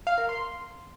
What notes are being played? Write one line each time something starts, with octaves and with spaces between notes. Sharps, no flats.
F5
A#4
C6